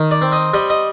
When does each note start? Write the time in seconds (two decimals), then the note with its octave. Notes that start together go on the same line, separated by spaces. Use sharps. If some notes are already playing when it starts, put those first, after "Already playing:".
Already playing: D#3
0.11 D5
0.21 C4
0.32 D#5
0.53 G3 D#5
0.70 D#5